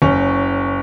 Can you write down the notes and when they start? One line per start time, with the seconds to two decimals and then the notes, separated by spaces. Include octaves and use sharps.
0.02 F#1 C#4